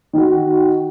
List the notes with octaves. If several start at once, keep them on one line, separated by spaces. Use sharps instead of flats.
D#3 F#4